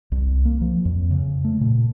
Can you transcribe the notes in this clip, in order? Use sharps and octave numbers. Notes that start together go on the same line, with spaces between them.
C2
A#3
F3
F2
C#3
A3
A#2